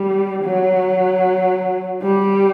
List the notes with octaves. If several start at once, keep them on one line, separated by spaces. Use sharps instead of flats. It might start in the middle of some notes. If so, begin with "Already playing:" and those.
Already playing: G3
F#3
G3